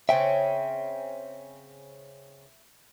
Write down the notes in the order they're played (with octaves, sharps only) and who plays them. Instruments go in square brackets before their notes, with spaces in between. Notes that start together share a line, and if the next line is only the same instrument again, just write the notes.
[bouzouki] C#3 C4 C#4 [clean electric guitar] E5 G5